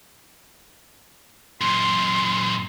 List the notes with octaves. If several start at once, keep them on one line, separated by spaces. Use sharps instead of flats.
F#2 A#2 C6